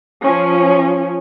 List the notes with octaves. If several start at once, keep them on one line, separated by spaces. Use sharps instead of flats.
F3 C#4